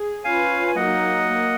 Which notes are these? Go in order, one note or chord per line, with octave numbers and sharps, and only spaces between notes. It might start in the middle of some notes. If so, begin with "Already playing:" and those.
Already playing: G#4
C#4 F4 B4 F5 G#5
G#5
F#3 A#3 D#4 D#5 F#5
A#3